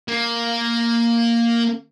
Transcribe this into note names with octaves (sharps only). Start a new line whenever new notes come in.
A#3